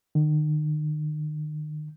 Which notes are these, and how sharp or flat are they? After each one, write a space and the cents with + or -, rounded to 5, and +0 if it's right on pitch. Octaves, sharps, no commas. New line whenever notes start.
D#3 -40